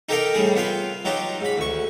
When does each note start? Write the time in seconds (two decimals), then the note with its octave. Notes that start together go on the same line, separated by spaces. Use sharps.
0.09 D#4 G4 A4 A#4 F5 G5
0.34 A2 G3 G#4
0.56 B3 F4 F5 G5
1.05 F#3 D#4 F4 G4
1.41 G#2 B5
1.58 D2 C#6